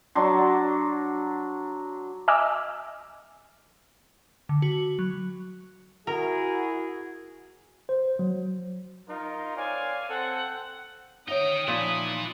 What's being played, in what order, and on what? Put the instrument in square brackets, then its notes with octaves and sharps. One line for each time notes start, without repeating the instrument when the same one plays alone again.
[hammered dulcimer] F#3 D4 C6
[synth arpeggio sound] D#5 E5 G#5 D6 E6 F6
[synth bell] D3
F#4
F#3
[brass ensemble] E4 F#4 G#4 [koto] A#4
[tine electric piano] C5
F#3
[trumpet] D#4 [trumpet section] F4 A#4
[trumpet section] C4 C#5 D5 [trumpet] F5 [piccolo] G#5
[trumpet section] C4 [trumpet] A4 [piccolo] F#5
[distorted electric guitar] D#4 G5 [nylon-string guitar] C#5 E5 F#5 [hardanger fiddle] D#6
[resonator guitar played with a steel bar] A#2 [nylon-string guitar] F3 D#4 [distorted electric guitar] E4 B4